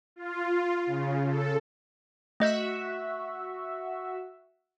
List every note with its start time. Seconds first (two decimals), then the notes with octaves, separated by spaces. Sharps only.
0.16 F4
0.86 C#3
1.27 A4
2.40 A3 F#4 D#5 E5 G6